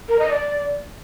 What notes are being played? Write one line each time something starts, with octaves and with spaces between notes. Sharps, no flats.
A#4
D#5
D5